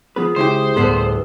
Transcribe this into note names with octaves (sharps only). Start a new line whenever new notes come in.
F3 B3 G#4 B4
C#2 E4 G4 C5
D2 A2 G3 B3 B4